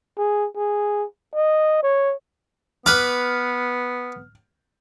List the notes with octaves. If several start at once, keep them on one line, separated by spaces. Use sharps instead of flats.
G#4
G#4
D#5
C#5
B3 B4 D6 F6